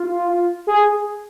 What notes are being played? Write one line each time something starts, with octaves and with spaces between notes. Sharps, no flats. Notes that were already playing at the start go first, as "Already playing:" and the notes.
Already playing: F4
G#4